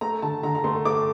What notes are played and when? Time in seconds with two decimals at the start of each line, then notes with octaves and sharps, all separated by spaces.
0.01 A3 A#5
0.22 D3 A5
0.43 D3 A#5
0.55 A#5
0.64 A3 C6
0.85 A3 D6